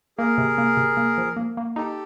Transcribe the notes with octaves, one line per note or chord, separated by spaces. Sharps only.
A#3 G#4 A#4
C3
A#3
C3
A#3
F3
A#3
A#3
D#4 G4 A4